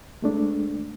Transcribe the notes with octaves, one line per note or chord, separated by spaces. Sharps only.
G#3 A3 D4